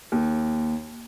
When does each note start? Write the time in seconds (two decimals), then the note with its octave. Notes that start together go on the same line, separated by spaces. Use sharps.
0.12 D#2